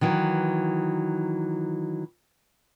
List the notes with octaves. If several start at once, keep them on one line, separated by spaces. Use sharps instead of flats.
D#3 E3 F#3